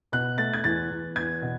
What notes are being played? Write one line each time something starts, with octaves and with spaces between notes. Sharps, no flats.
B2 F#6
A3 A6
G#6
E2 A6
E2
E2 G#6
B2